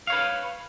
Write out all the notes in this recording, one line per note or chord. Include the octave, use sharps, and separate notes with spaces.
B4 C#5 F5